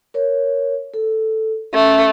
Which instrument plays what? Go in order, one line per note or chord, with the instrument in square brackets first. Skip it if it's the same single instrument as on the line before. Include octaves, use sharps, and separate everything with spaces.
[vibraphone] A#4 C#5
A4
[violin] A3 [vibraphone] C#4